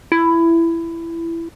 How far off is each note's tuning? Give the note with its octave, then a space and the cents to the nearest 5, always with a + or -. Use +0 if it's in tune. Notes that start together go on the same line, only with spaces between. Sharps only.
E4 +15